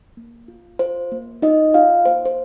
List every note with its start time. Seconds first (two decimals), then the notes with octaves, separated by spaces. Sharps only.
0.17 A#3
0.48 F4
0.79 F4 C5
1.12 A#3
1.42 D#4 F4 D#5
1.74 F4 F5
2.05 A#3 C5
2.25 C5